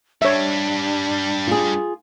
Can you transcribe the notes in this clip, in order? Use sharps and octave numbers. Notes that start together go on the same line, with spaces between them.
G2 G3 D4 C#5 E5
F4 G#4